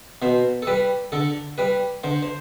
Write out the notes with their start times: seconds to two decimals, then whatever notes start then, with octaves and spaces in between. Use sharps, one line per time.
0.22 B2 C5
0.62 A4
0.67 G3 B4
1.12 D3 A4
1.58 G3 B4
2.04 D3 C5
2.23 C5